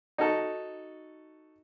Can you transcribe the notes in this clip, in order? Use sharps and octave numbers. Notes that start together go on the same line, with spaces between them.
D#4 F#4 A4